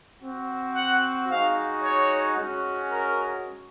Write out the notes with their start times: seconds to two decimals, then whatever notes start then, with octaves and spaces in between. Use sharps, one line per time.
0.21 C4 F#4
0.74 F#5
1.28 G#3 D#4 F#4 F5
1.82 C#5
2.36 G#3 C#4 F#4
2.89 A#4